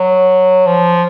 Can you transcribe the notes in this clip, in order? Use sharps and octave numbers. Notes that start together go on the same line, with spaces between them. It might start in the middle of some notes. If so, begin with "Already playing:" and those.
Already playing: F#3
F3